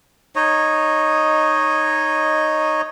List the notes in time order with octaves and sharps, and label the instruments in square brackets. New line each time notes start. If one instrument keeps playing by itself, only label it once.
[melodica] D#4 C#5 D#5